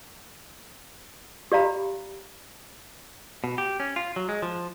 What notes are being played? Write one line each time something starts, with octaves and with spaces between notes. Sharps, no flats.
G4 D5 F5 A#5 B5
B2
G4
C#4
F4
F#3
G#3
F3